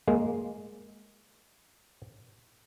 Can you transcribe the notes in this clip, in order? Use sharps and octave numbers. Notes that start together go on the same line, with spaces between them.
G#3 A#3